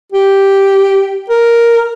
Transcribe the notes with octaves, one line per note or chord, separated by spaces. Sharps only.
G4
A#4